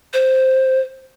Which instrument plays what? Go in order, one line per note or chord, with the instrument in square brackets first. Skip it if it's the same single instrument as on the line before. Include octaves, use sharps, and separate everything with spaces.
[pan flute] C5